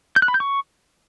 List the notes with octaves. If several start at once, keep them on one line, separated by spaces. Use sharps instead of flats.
G6
F#6
B5
G6
C#6